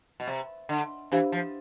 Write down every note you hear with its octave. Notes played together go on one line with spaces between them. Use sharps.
B2
C3
D3
E3 D4 G4 C5 F5
F3